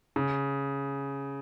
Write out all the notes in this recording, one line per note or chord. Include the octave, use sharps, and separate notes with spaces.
C#3